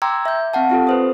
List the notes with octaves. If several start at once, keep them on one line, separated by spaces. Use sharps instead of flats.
G5 A#5 C6 D6 E6 G#6
E5 G6
C4 F5 F#5 A5
C4 F4 G4 A4
B4 C5 D#6